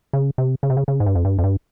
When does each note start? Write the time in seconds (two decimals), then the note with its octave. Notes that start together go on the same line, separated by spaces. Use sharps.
0.13 C#3
0.38 C3
0.63 C#3
0.70 C3
0.77 C#3
0.88 C#3
1.00 G#2
1.06 G2
1.15 F2
1.25 G2
1.38 F2
1.44 G2